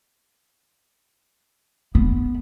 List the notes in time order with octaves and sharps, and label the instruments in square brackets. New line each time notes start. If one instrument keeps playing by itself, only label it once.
[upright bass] B3